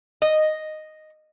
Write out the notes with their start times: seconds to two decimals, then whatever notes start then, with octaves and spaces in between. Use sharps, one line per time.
0.22 D#5